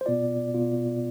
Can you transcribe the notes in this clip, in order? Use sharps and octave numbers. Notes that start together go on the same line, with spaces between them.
C5
B2 B3 F4 D5
B2 B3 F4